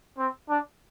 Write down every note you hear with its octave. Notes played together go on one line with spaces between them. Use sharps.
C4
D4